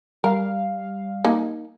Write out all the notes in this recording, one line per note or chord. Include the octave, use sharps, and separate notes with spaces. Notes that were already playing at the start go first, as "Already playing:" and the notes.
G3 A#4 F5
A#3 D#4